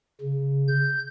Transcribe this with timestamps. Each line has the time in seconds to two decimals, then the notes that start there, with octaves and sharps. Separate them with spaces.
0.21 C#3
0.68 G6